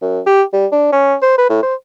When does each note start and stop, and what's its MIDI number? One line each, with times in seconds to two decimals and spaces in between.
0.02 0.20 42
0.26 0.43 67
0.53 0.67 55
0.72 0.90 62
0.92 1.15 61
1.22 1.37 72
1.38 1.45 71
1.49 1.59 45
1.63 1.75 72